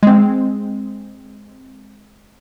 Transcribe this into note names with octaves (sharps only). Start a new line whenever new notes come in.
G#3 C4